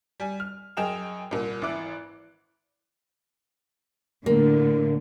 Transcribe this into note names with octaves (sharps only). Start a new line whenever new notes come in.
G3 G#5
F6
F#2 G#4 D#5 G5 E7 F7
C2 A#2
G#1 E3 E5 D6 F#6
A2 D3 A#3